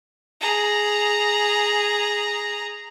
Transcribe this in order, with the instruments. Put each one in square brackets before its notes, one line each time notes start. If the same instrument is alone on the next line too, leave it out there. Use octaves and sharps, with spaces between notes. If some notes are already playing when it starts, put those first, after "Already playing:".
[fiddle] G#4 A#5